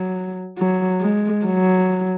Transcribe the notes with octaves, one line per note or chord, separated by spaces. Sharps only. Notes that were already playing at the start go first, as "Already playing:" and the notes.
Already playing: F#3
F#3
G#3
F#3